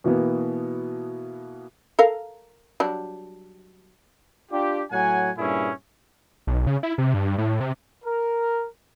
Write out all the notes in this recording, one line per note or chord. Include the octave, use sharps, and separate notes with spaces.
B2 E3 A#3 B3
A4 A#4 F5
F#3 G3 D4
D4 F4 G4
A2 F#3 F#5 G#5
G2 A#2 C#4 E4 G#4
B1
C#3
E4
C3
G2
A2
C3
A#4